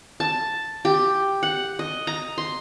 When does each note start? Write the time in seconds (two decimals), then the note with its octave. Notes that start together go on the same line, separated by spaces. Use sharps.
0.20 A5
0.85 G4
1.43 F#5
1.79 D#5
2.07 A#5
2.38 C6